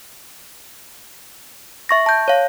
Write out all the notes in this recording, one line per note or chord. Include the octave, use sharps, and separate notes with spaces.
E5 C#6 A#6
A5 G6
C#5 F5